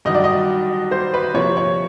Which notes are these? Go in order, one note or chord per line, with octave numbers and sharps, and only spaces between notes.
G2 D#3 F#3 D#5
D5
D#5
C5
B4
C3 F3 A#3 C#5
C#5